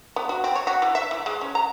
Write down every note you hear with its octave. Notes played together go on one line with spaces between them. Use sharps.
B3
F#4
C4
C#5
F#4
E3
E5
E3
G#3
C#4
A#5